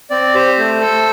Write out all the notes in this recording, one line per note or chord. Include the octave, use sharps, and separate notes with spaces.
C4 D5
G4 C5
A3
A4